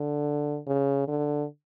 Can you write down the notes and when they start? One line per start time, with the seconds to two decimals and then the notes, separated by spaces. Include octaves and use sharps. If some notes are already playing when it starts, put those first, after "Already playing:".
Already playing: D3
0.67 C#3
1.08 D3